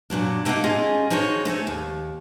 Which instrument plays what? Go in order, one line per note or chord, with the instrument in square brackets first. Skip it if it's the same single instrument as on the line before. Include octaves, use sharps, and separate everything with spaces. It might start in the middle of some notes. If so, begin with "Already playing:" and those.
[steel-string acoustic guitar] F#2 A#2 F#3 D4
A3 A#3 D#4 E4 F5 F#5
C#4 F4 G#4 D#5
F3 D#4 F#4 G#4 C#5
A3 C#4 A4 C#5
D#2